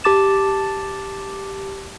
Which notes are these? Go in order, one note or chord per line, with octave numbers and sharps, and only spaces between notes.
G4 A5 D6 A6 E7